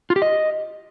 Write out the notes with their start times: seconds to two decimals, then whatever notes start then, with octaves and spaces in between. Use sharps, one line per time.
0.10 F4
0.16 G4
0.22 D#5